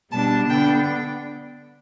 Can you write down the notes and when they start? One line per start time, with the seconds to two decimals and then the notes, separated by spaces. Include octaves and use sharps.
0.12 B2 G3 D4 A5
0.49 D3 B3 D4 G5